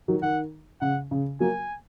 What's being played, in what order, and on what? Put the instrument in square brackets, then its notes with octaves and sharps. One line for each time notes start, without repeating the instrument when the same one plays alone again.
[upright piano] D#3 F#3
[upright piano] D#3 [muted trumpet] F#5
[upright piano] C#3 [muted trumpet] F#5
[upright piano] C#3
[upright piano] F#3 A#3 [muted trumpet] G#5